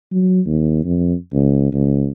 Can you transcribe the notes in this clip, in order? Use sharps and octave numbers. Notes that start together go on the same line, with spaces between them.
F#3
D#2
F2
C#2
C#2